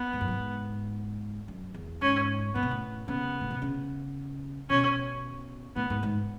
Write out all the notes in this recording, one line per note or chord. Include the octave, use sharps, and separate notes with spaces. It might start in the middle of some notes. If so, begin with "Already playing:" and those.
Already playing: B3
G#2
F#2
G#2
F#2
E2
G#2 C#4
A2 B3
B2
A2
C#3 B3
A2
B2
C#3
B2 C#4
A2 B3
G#2
G#2